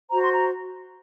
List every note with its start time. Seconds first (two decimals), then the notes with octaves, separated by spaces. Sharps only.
0.11 F#4 C5 A#5
0.22 C6
0.33 A#5